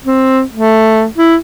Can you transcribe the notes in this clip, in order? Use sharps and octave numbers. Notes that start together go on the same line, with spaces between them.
C4
A3
E4